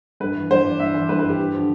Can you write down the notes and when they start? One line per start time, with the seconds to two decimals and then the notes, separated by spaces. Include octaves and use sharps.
0.20 G2 B4
0.35 E3
0.50 G2 C5
0.65 E3 D5
0.80 G2 E5
0.94 E3 D5
1.09 G2 B4
1.19 B4
1.24 E3
1.29 G4
1.39 G2
1.54 D3 F3